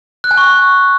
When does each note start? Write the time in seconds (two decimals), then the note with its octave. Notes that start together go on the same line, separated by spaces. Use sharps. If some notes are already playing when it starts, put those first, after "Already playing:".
0.24 F#6
0.31 G#5
0.38 C#6